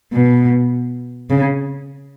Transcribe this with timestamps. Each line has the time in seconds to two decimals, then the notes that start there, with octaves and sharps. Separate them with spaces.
0.13 B2
1.30 C#3